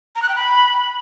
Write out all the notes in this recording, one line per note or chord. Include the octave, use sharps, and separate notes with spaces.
A#5
F#6
G5
B5